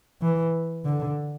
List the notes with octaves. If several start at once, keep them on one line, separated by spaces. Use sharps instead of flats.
E3
D3